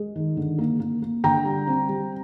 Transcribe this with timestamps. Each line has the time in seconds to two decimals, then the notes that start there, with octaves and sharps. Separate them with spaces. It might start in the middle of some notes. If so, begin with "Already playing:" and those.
Already playing: G#3
0.16 D#3
0.37 D3
0.58 A#3
0.80 A#3
1.02 A#3
1.24 D3 G5 A#5
1.45 G3
1.67 C4
1.89 G3